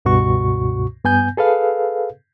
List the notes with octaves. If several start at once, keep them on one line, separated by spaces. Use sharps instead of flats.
C#2 G2 B2 F#4 C#6
G2 B3 G#5 G6
G#4 A4 B4 F5